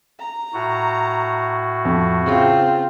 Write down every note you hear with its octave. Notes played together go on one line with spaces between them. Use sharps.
A#5
A2 F#4
F2
C#3 C4 F4